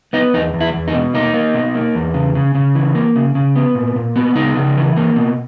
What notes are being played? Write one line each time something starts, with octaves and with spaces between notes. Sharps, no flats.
B3 D#4
E2 D#4
E2
E4
E2
D#4
B2
A#3 D#4
A#3
B2
A#3
E2
C#3
C#3
C#3
E3
A#3
C#3
C#3
B3
A#2
A#2
B3
C#3 D#4
C#3
E3
A#3
B2